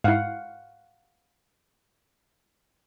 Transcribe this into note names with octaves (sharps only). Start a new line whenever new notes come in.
G#2 E4 F5 F#5